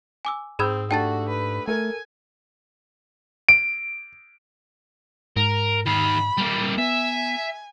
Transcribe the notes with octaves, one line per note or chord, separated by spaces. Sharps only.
G#5 D6 E6
G#2 C4 G#4 B5 D#6 E6 G6 G#6
A3 D4 F#4 G4 G5 A5 A6
B4
A3 A4 A#4 G#5
D7
G#2 A#4
D#3 F5 B5
G3 A#3
B3 E5 G#5